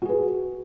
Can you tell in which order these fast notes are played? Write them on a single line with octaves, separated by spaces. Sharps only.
F#4 G#4 B4